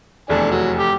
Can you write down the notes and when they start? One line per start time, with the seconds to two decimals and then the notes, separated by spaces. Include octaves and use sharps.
0.29 F1 E2 D4 A4 G#5
0.51 F#3
0.79 G4